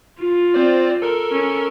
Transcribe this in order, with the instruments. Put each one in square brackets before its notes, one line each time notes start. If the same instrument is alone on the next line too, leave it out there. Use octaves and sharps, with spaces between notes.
[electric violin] F4
[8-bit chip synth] C4 C5 D5
A4 A#4
[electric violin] C#4